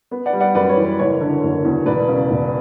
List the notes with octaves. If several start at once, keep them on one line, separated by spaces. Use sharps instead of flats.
B3
D5 F#5
G3
D5 F#5
F#2 B4 D5
C#5
E3
B4
F#1 C#5
D3
F#1
E2
E1 B4 D5
C#3
E1